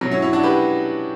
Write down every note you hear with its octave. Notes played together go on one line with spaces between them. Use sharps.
B2 F#3
C#4 E4
C#4 E4
D4 F#4
G4 B4